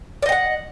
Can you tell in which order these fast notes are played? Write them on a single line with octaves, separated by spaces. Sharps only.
D5 D#5 G5 F#5